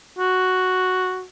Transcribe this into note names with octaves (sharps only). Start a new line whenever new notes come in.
F#4